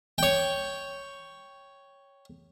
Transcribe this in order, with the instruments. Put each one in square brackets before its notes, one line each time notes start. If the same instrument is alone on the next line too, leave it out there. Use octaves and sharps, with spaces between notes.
[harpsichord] C#5 G5